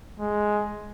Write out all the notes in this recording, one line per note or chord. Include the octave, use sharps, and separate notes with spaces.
G#3